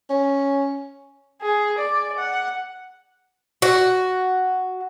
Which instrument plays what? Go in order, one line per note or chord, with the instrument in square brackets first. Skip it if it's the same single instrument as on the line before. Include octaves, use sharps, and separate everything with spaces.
[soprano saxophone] C#4
[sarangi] G#4
D5
F#5
[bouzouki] F#4